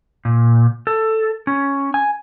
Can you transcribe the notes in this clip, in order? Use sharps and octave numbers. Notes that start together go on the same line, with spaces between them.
A#2
A4
C#4
G#5